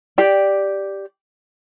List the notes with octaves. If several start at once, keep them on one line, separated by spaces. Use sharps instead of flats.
G4 D5